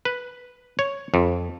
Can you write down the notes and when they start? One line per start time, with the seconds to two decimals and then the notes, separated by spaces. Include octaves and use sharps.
0.05 B4
0.79 C#5
1.14 F2